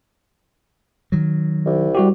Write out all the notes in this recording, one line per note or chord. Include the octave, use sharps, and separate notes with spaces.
D#3 F#3
C2
G3 F#4 G4